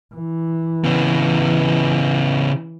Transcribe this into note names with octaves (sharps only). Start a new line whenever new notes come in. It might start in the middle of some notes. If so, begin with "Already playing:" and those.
E3
C#3 B3